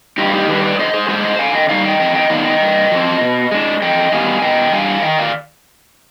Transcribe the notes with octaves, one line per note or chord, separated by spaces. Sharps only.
G2 D#4 G4
F4
D#4 G4
D#3 G3 D4 G4 B4
B4 D5
D3 C5 D#5
G#4 C5
G#3 D4 G#4 C5
C5 D#5
D3 F5 G#5
D#5 G5
G3 B3 D#4 D5 F5
D#5 G5
F2 D#5 G5
D#5 G5
D#3 B3 D#4 D5 F5
D#5 G5
G2
F3 C4
B2
G#3 D4
F2 D#5 G5
D#3 G3 B3 D#4 F5 G#5
B2 D#5 G5
G3 D4 F5 G#5
D#3 D#5 G5
D5 F5